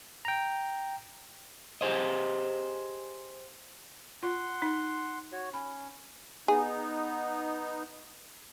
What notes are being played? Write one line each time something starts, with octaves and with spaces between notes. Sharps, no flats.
G5 A#5
G4 G#4 C5 D#5
F4 F#5 C6
D#4
F#4 C#5
C#4 B5
B3 D#4 G#4